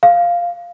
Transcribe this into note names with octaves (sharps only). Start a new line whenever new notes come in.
F5